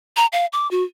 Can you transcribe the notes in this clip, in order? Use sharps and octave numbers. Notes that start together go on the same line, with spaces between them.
A#5
F5
D6
F#4